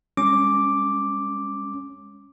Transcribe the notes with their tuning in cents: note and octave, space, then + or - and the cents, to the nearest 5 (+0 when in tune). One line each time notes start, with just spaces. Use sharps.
G#3 -40 C#4 +0 D6 +0